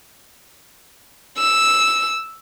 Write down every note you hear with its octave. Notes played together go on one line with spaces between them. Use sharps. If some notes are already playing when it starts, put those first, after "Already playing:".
E6